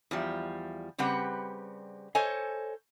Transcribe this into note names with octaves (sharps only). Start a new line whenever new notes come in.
E2 F3 G3
C#3 G3 C4 G4 B4 F#5
A4 C5 C#5 D#5 G#5